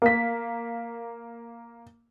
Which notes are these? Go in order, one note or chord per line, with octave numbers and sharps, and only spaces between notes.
A#3 B6